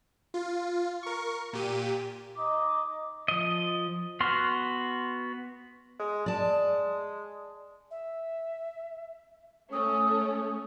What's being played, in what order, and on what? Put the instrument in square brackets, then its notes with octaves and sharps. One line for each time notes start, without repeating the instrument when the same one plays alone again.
[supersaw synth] F4
A#4 C#6
A#2 G4 D#7
[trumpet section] D#4 D#5 [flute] D6
[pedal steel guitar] F3 D#5
B3 F#4 C6 F6
[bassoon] G#3
[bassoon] G#3 [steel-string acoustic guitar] D5 A5
[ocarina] E5
[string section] A3 C#4 [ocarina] D#6